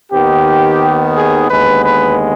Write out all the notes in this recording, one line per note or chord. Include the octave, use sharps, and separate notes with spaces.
D#2 D#3 B3 G4
G#4
D#2 D3 G#3 B3 B4
B4